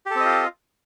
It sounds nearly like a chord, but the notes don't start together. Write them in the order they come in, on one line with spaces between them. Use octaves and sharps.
G4 A4 C4 D#5 F4